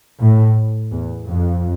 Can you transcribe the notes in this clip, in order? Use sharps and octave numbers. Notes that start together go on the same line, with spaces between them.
A2
E2
F2